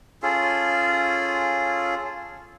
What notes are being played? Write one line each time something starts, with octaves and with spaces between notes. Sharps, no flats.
C#4 F4 G#4 A4